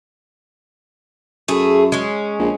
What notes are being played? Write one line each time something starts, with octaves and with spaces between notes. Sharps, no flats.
F#2 A3 G#4
G#3 C#4
A#1